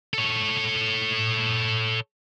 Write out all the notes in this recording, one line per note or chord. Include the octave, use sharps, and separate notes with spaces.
A4 C#5